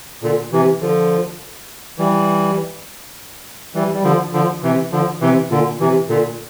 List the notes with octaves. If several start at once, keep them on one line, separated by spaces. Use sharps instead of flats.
A#2 D3
C3 E3
D3 F3
E3 G3
E3 G3
G3
D3 F3
D3 F3
C3 E3
D3 F3
C3 E3
A#2 D3
C3 E3
A#2 D3